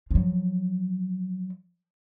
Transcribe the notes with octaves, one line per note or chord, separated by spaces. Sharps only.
F3 F#3